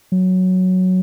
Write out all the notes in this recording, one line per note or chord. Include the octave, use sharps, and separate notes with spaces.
F#3